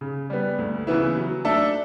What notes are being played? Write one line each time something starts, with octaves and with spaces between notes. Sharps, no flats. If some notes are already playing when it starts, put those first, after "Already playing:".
C#3
G3 B3
D2
C#3 E3 B3 E4
F#3
A3 D4 A4 E5